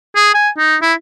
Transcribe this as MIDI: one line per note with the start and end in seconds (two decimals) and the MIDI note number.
0.16 0.31 68
0.34 0.49 80
0.58 0.76 63
0.82 0.93 64